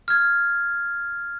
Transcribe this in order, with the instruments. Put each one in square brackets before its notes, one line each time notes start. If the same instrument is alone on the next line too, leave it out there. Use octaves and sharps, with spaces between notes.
[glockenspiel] F6 G#6